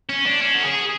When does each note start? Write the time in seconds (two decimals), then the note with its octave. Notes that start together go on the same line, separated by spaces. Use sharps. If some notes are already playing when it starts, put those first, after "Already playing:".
0.09 C#4
0.26 D4
0.42 C#4
0.55 F#4
0.64 G#4